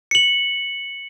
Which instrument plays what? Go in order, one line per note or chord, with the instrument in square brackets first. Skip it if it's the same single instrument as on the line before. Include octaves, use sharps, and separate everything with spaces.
[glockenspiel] C#7 F#7